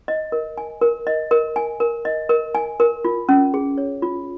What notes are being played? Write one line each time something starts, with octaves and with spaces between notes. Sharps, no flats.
D#5
A#4
G#5
A#4
D#5
A#4
G#5
A#4
D#5
A#4
G#5
A#4
F4
C#4
G#4
C#5
F4